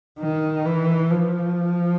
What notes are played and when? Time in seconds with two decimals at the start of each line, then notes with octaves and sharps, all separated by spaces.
0.20 D#3
0.65 E3
1.11 F3